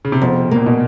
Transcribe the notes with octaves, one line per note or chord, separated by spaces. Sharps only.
C#3
C3
F2 B2
A#2 A#3
B2